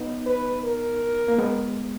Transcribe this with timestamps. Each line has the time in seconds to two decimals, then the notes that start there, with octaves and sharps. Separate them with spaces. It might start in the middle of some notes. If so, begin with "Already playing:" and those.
Already playing: B3 D#4
0.27 B4
0.65 A#4
1.28 A#3
1.38 G#3 B3